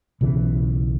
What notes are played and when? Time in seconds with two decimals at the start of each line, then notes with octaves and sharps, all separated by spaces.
0.21 B1 C#3 E3